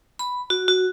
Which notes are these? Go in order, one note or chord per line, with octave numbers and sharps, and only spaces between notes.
B5
F#4
F#4